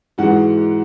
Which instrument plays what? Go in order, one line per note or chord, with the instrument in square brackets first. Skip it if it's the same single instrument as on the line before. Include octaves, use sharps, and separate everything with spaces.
[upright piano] G#2 E3 G#3 F#4 F#5